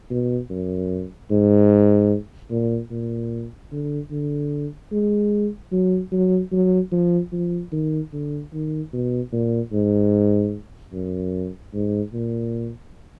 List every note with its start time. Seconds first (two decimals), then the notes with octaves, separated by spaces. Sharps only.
0.10 B2
0.50 F#2
1.31 G#2
2.51 A#2
2.90 A#2
3.72 D3
4.11 D3
4.92 G#3
5.72 F#3
6.12 F#3
6.52 F#3
6.92 F3
7.33 F3
7.72 D#3
8.12 D3
8.53 D#3
8.93 B2
9.33 A#2
9.72 G#2
10.93 F#2
11.73 G#2
12.13 A#2